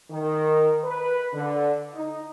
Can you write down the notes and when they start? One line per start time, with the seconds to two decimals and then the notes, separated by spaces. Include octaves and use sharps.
0.10 D#3
0.83 B4
1.33 D3
1.95 D#4